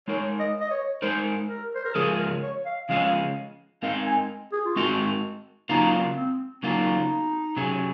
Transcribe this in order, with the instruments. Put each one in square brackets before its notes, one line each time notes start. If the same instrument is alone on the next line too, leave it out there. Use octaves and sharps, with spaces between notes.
[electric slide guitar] G#3 D#4 A#4 [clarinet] C#5
[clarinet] D#5
D#5
C#5
[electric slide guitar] G#3 D#4 A#4 [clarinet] C5
[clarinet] A#4
C5
A#4
[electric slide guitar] C#3 F3 G#3 C#4 [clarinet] G#4
[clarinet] A#4
C#5
F5
[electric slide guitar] C#3 F3 G#3 C#4 [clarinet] F5
[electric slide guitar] G#3 C4 D#4 A#4 [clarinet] F5
[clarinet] G#5
G#4
F4
[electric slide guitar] G#3 C4 D#4 A#4 [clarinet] F#4
[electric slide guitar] C#3 F#3 A#3 F4 [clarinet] D#4
[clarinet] C4
[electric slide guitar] C#3 F#3 A#3 F4 [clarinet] D#4
[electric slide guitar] C3 F#3 C#4 G#4